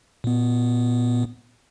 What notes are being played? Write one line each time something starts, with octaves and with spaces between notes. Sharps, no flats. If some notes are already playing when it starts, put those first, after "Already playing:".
A#2 B3